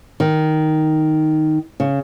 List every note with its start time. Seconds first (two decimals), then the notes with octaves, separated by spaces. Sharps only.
0.20 D#3
1.80 C#3